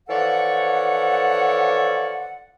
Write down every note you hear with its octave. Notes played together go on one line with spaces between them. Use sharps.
E3 F3 A4 C#5 D5 F#5